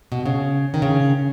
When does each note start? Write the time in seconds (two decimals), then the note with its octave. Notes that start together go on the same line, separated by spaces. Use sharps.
0.12 B2
0.26 C#3
0.74 D#3
0.82 C#3